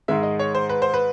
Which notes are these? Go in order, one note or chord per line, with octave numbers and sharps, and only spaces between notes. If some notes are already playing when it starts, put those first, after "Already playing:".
G#2 D#3 G#3 E5
D#5
C#5
C5
B4
C5
B4